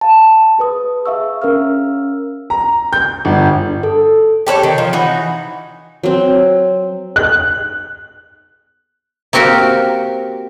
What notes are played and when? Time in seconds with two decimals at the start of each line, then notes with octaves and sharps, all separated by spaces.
0.01 F5 A5
0.59 G#4 B4 D#6
1.06 G#4 E5 F5 C#6 E6
1.42 C#4 A#4 F5 E6 F6
2.50 A#5
2.93 G6
3.25 G1
3.83 A4
4.47 G4 A4 B4 C#5
4.63 D#3
4.78 F3
4.93 E3 D#4 F#4
6.03 F#3 C4
7.16 F#6
9.33 A#3 C4 F#4 G4 A#4